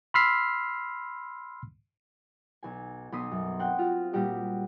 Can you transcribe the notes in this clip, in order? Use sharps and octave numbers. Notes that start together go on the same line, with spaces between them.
B5 C6 E6 F6 B6 C7
B1 G#5
B1 B3 B5 C6 D#6 B6
F#2
C4 F#5 G5 F#6
F4 F#4
A#2 G3 F#4 G4 D#5